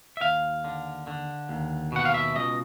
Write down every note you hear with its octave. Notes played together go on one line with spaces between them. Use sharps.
E5
D#2 F5
D3
D3
D#2
B2 F#5
F5
E5
C#2 D#5